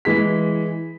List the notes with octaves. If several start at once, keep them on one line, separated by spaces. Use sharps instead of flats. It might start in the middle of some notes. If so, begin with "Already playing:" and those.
E3 G#3 B6